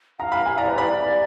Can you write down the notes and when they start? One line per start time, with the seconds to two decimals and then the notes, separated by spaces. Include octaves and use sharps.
0.19 F5 F#5 A#5
0.32 B5
0.45 G#5
0.57 D5 A#5
0.68 B4
0.78 D5 B5